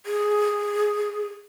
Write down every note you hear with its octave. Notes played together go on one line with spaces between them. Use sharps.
G#4